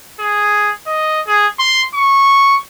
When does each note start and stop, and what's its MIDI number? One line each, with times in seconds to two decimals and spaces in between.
0.20 0.72 68
0.87 1.21 75
1.27 1.47 68
1.59 1.82 84
1.95 2.57 85